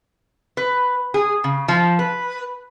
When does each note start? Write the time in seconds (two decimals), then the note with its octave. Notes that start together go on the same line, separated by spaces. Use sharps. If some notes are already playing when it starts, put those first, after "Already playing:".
0.57 B4
1.14 G#4
1.44 C#3
1.68 F3
1.99 B4